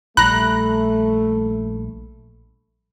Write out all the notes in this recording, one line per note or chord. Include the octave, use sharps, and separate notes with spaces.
A#1 G3 A3 A#5 B5 F#6